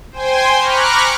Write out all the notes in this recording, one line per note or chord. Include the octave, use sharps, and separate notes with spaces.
C5 G5 G#5 C6
A#5 B5 C#6 D6 F6 F#6